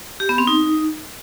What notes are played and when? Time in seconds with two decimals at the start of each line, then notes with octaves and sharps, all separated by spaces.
0.20 G4
0.29 B3
0.38 C4
0.47 D#4